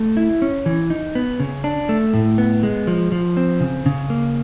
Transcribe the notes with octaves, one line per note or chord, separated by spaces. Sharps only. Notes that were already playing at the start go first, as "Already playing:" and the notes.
Already playing: A3
E4
C#4
E3
D#4
B3
C#3
D4
A3
A2
B3
G#3
F3
F3
C4
C#3
C#3
A#3